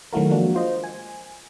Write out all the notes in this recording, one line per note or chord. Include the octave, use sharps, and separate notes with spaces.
D#3 F#3 A3 E4 F#4 A#4
F3 G#3 A#3 D4 F#4
F4 C5 D#5
G#5